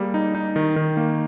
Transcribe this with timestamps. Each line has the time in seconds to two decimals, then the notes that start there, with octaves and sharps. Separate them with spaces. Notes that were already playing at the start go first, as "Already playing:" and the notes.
Already playing: G3 A#3 G#4
0.14 D#4
0.35 D#4
0.56 D#3
0.76 D#3
0.97 A#3